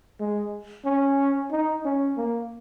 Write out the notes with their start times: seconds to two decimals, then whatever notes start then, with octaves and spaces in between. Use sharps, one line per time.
0.19 G#3
0.85 C#4
1.52 D#4
1.85 C#4
2.17 A#3